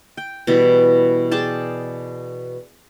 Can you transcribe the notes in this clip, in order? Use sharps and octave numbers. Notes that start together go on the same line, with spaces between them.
G5
B2 E3 G3
G#4 D5 G5 A5